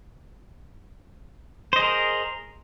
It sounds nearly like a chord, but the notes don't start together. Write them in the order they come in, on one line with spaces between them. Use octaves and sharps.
C5 D#5 G#4 A#4